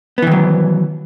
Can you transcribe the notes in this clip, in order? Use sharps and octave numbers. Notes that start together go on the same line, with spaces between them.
D#3 E3 F#3 B3